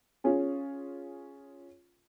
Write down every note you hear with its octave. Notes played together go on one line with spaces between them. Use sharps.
C#4 F4 G#4